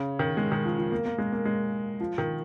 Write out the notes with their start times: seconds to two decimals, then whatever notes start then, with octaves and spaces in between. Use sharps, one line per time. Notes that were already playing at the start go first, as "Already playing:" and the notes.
Already playing: C#3
0.19 D#3
0.37 G#3
0.52 D#3
0.65 F3
0.78 F3
0.92 A#3
1.06 A#3
1.18 G#3
1.32 A#3
1.45 G#3
2.00 F3
2.18 D#3